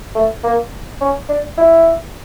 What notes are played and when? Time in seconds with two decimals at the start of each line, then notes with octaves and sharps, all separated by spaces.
0.15 A3
0.44 A#3
1.01 C#4
1.29 D4
1.57 E4